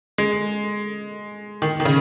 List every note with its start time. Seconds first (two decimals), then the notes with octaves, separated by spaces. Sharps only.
0.18 G#3
1.62 D#3
1.80 D#3
1.85 C#3